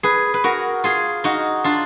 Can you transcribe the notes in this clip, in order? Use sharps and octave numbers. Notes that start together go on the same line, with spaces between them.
G#4 B4
B4
F#4 A#4
F4 G#4
D#4 F#4
D4 F4